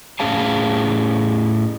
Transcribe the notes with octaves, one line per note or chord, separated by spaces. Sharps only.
A2 C#4 G#4 F5 A5